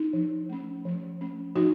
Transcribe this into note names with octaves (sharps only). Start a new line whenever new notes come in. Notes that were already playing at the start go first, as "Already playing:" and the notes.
Already playing: D#4
F3
A3 C#4
F3
A3 C#4
F3 D#4 F#4